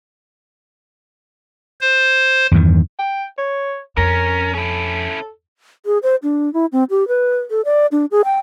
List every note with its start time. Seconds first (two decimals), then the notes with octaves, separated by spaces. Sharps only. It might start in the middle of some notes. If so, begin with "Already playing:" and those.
1.81 C5
2.51 E2 G2 D#3
2.99 G5
3.38 C#5
3.97 F2 C#4 A#4
4.55 C#4 E4 A4
5.86 G#4
6.03 C5
6.23 D4
6.54 E4
6.72 C4
6.90 G4
7.08 B4
7.51 A4
7.65 D5
7.92 D4
8.11 G#4
8.25 G5